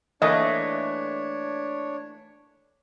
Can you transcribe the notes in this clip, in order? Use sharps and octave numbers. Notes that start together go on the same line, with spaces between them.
E3 A3 A#3 D4 C#5 D#5